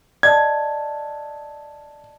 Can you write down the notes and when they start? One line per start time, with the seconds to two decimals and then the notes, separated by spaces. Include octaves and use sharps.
0.23 D5 D#5 A5 G#6